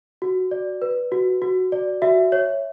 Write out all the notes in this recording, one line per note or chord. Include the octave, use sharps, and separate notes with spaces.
F#4
D5
B4
F#4
F#4
D5
F#4 E5
C#5